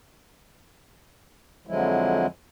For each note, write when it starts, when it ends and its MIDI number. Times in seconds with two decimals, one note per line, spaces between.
1.67 2.26 41
1.67 2.26 50
1.67 2.26 53
1.67 2.26 54
1.67 2.26 56
1.67 2.26 64